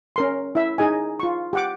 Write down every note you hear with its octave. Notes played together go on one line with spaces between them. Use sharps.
C#4 A#4 C6
E4 E5
D#4 G#4 D#5 G#5
F4 C#6
G4 F#5 D6